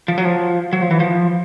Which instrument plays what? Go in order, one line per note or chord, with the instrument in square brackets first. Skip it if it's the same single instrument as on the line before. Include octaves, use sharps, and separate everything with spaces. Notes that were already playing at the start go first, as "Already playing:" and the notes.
[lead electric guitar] F3
F#3
F3
F#3
F3
E3
F3